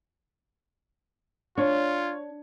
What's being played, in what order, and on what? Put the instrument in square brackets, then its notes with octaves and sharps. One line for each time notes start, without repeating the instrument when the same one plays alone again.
[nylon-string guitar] D4 [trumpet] F4 [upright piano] C#5